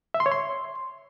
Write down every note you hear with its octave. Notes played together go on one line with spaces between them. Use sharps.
E5
C6
C#5
C6